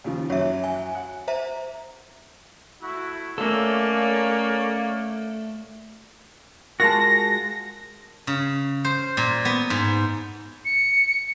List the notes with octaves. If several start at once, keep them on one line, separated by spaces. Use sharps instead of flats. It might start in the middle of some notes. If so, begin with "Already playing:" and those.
D#2 C#3 F3
F#2 F#3 C#5 E5
G#5
F#5
C5 E5 A#5
A3 E4 F#4
A3 A#3 C#4 A4 C#5 D5 F5
G#3 F4 F#4 A#4 A5 A#6
C#3
C5
A#2
B3
G#2
C#7